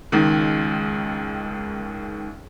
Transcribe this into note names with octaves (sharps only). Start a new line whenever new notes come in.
C#2 D#3